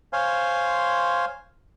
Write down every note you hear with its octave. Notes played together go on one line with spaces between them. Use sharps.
C5 C#5 F5 G#5 C6